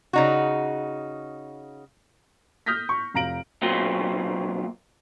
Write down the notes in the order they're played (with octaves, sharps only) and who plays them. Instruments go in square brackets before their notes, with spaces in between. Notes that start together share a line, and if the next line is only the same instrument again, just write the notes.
[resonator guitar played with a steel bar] C#3 D#4 F#4
[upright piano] D#6 F6 G6 A#6 B6
C#6
F1 F5 A#5 A#6 D7 F#7
[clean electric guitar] B1 A#2 F#3 A#3 C4